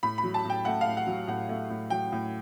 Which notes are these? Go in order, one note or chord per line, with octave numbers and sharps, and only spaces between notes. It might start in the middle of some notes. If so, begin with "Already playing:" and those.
A2 B5
B5
F#3
A5
A2 G5
A3 F#5
F5
A2
F#5
F#3
A2 F#5
A3
A2
F#3 G5
A2